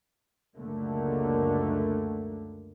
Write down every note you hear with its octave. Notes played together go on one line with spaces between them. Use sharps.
C#2 F#2 D3 A3 A#3